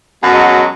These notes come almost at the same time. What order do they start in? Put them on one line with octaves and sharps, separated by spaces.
F#2 B2 G#3 F#3